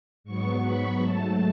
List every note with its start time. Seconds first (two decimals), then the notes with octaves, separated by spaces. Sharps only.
0.24 G#2 F#3 B3 C#6
0.62 B5
0.99 G#2 F#3 A3 A5